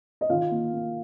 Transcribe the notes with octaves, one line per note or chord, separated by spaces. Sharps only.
D#5
D#3 F4 F5
A#3
A#3